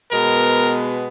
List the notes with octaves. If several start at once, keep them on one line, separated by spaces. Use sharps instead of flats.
B2 G#3 B3 A#4